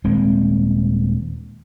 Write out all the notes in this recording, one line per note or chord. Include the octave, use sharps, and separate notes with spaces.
D#1 G#3 C4